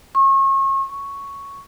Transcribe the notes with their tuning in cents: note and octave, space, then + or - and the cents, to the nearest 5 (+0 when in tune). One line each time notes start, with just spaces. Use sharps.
C#6 -35
C#6 +5